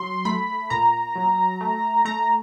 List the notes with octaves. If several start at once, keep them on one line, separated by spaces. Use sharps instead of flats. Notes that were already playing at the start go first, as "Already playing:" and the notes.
Already playing: F#3 C6
A3 B5
A#2 A#5
F#3
A3
A3 A#5